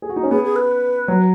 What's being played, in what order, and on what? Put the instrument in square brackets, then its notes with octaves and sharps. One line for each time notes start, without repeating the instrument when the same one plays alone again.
[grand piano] G#4
F#4
D#4
C#4
[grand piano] B3 [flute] G#4
[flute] G#4
B4
[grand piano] F#3